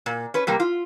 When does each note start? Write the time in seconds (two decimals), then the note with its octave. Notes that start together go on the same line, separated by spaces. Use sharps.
0.06 A#2
0.34 C#4 B4
0.47 C3 G3 A#3
0.60 F4